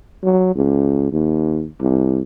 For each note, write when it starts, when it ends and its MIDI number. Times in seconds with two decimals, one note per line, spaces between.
0.23 0.51 54
0.55 1.11 37
1.12 1.66 39
1.80 2.23 36